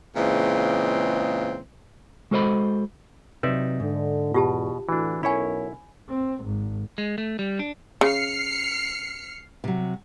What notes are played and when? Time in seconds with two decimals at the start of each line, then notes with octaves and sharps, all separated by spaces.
0.16 A#2 C#3 E3 G#3 C4
2.31 G#3 F#4 A4 C5 D#5 B5
3.43 C3 F#3 D#4 B4 D5 E5
3.80 G#2 D3
4.34 E2 B2 F4 G4 A5
4.89 A2 D3 E3 D4 F#4
5.23 B1 C#4 E4 A#4 C#5 G#5 B5
6.10 C4
6.45 G#1
6.98 G#3
7.18 A3
7.39 G3
7.59 D4
8.01 C#3 F6 C7 C#7
9.64 C3 F#3